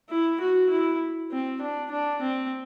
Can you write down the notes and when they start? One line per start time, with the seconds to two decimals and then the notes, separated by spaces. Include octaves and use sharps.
0.10 E4
0.41 F#4
0.70 E4
1.32 C4
1.61 D4
1.91 D4
2.21 C4